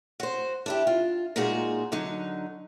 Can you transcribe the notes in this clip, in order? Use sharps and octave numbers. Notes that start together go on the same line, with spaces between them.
F#4 C5
D4 E4 G4
F4
A#2 G#3 D#4 F4 F#4 G#4
D3 F#3 D#4